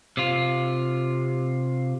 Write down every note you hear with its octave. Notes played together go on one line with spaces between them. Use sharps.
C3 F4